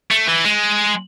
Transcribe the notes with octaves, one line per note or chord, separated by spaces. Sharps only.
A3
E3
G#3